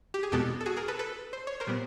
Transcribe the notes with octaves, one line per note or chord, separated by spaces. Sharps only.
G4
G#4
E2 B2 G#3 B3 G4 A4
A4
F#4 G#4
G#4 A#4
A4 B4
A4 B4
C5
C#5
A#4 C5
A#2 G3 B3